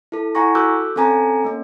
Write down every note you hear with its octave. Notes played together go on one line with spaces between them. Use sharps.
E4 A4
E4 F#5 G#5 A#5 C#6 A#6
F#4 A4 D6 E6 F#6 G6
C4 C#4 A4 G#5 A#5
A#3 C#4